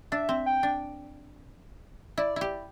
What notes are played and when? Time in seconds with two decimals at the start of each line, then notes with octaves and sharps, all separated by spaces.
0.12 D4 E5
0.29 C4
0.46 G5
0.63 D4
2.18 E4 D5
2.36 E4 G4